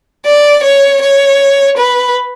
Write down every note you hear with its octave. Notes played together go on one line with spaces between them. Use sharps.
D5
C#5
C#5
B4